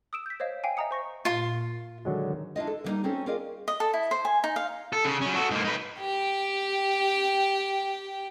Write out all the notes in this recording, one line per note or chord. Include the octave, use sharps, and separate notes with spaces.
D#6 E6 D7 E7
G6 B6
C5 C#5 D#5 F5
F5 G5 G#5
D#5 E5 A#5 D#6 C#7
C5 C#6 A#6
A#2 F4 C6
D3 D#3 F#3 G#3
D4 E4 F4 D#5
A4
D3 G3 A#3 D#4
C4 C#4 F#4 A4
F4 G#4 A#4 D5 D#5 F5
D#5
A4
E4
C5
G#5
D#4
F5
A4
C#3
F#3 C#4
F#4 A4
G#2 A#3
D#4 B4
G4 G5